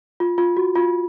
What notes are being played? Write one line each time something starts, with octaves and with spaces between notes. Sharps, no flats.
F4
F4
F#4
F4